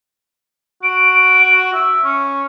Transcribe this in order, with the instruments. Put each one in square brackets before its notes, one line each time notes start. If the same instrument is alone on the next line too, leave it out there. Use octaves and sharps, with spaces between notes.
[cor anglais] F#4 [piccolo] D7
[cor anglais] E5
[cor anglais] C#4 [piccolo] C#6